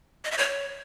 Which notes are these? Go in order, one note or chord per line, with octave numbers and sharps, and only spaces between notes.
D#5
E5
C#5